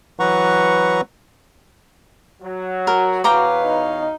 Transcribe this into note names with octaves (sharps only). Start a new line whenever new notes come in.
E3 F#3 B4 F#5 A#5 C#6
F#3
F#4 A#4
E2 B4 C#5 F5 G5 A#5 D6
D#4